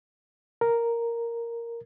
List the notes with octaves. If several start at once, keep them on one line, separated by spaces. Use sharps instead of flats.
A#4